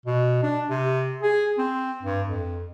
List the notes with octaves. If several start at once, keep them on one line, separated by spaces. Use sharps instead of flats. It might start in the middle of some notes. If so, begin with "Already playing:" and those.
B2
D4
C3
G#4
C4
G2
F2